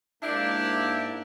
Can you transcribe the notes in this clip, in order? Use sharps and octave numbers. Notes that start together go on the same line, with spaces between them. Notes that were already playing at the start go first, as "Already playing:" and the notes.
G#2 A#3 D4 E4 G4